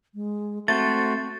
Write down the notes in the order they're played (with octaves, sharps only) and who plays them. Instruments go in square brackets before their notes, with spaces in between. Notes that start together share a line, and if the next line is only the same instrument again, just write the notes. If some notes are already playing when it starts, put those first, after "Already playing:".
[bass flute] G#3
[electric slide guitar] A3 [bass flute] C4 [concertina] F#4 C5 [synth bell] A6